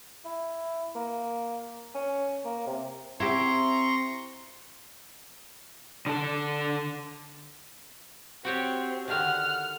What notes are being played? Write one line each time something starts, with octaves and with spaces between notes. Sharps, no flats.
E4
A#3
C#4
A#3
C3
C4 E4 G4 A#5 C6 C#6
D3 A4
C4 F#4 G4 C#5
D3 D#3 F#5 F6